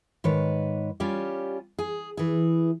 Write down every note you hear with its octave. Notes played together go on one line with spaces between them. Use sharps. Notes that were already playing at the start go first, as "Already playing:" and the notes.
G#2 D#3 B4 C#5
G3 C#4 F4 G4
G#4
E3 G#4